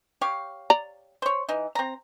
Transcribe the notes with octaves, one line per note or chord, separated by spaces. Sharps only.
G4 C#5 F5
D5 A#5
C5 C#5
E3 D#4
C4 A#5